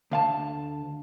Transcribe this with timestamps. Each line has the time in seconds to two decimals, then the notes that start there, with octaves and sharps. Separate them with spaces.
0.11 D2 F5 A5